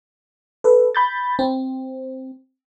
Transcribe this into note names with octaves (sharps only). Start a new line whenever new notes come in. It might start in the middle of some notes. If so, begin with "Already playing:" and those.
A4 B4
B5 G6 A6
C4